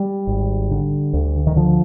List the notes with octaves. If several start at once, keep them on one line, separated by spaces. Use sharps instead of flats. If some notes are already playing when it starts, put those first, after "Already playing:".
Already playing: G3
G#1
D3
D2
D#3
D3 F3